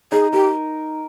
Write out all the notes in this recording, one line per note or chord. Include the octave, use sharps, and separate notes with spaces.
D#4 G#4
G4 A#4